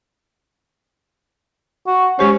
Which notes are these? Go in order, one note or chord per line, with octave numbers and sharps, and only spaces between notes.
F#4
G#3 C#4 G4 C5